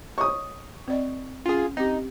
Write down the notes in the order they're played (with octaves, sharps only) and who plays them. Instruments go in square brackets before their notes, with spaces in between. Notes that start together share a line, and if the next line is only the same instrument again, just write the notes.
[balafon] C#5 D#5 [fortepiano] C#6 D#6
[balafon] C4 D5 D#5
[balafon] C#4 F#5 [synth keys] F4 G#4
[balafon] C4 G4 [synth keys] D#4